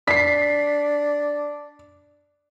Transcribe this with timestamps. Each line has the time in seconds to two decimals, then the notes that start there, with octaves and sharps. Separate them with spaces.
0.08 D4 B6 C7